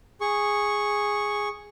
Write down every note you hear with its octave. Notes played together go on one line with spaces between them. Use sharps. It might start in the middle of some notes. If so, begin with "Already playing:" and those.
G#4 C#6